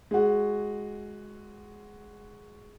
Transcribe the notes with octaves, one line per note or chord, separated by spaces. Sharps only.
G#3 F#4